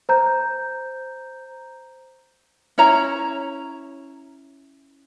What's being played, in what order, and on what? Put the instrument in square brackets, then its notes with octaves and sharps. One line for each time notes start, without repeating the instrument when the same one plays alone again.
[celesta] C5 A#5 G6
[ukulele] C#4 E4 C#5 A#5